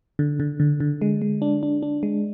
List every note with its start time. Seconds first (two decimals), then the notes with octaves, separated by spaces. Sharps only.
0.19 D3
0.40 D3
0.60 D3
0.80 D3
1.01 G#3
1.22 G#3
1.42 D4
1.63 D4
1.83 D4
2.03 G#3